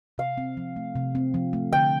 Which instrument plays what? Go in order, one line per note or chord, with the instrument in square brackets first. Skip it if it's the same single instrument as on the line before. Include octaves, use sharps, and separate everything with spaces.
[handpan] C3 [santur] F5
[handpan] C4
F3
A3
C3
C4
F3
A3
[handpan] D3 [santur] G5